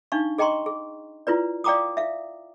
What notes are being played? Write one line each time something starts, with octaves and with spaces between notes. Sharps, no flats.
D4 D#4 F5 C#6
G#4 D#5 G5 A#5 C6 C#6
G#4
E4 F4 B4 D5
D5 F5 G5 A#5 D6 D#6
E5 F5